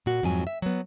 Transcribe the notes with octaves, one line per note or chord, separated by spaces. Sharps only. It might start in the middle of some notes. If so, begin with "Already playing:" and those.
A#2 F#4
F2 G#2 F#3 G#5
E5
F#3 B3